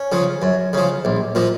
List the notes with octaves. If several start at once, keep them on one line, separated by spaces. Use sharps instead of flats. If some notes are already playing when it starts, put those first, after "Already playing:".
Already playing: C#4
C#3 F3
F#2
C#3 F3
A#1
A#2 F3